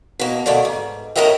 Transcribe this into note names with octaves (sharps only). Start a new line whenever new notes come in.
B2 A#3
D2 B2 A3 A#3 D5
G#2
A2 C#4 A#4 D#5 E5 G5